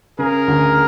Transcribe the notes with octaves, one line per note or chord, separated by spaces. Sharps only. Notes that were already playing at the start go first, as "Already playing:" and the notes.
C#3 G#4 A#4
D2